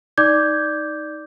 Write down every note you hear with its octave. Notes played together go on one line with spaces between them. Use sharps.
D#4 D5 D6 G6 G#6